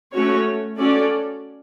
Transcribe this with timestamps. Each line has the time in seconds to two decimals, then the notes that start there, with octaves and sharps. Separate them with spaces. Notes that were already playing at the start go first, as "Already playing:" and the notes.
0.13 A3 C#4 F#4 C#5
0.77 C#4 F#4 A4 D5